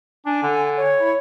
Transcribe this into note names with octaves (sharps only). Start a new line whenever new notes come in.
D4 G#5
D3
C#5
E4